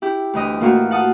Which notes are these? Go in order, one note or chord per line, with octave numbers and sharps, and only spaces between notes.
E4 G4
D2 E3 D#5
A2 E3 A#3 F4 F#4 A4
F5 F#5 A5 D#6